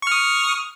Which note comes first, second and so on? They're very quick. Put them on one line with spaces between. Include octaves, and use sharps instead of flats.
C#6 F6 D#6